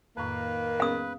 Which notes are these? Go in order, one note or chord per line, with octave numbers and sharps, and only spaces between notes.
F2 A2 D#3 A#3 B4
B3 C#4 G#4 F5 D#6